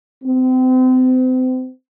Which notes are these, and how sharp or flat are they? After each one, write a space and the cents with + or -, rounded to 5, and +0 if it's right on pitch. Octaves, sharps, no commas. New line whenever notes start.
C4 -35